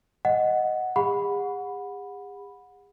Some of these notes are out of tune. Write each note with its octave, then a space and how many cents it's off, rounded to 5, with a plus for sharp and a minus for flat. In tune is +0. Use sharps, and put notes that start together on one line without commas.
D#5 +0 F#5 +0
G#4 -45 F#5 -20 B5 +0